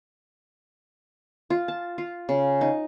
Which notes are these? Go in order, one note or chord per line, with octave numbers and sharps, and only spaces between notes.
F4
A5
F4
C#3
D#4